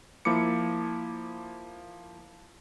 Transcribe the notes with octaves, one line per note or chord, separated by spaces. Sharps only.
F3 A#3 E4 D6 C#7